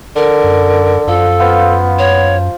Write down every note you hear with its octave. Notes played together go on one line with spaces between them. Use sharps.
D3 A#4
F#2
F#2 F3 A4
B3 F4 C5 F5
C#5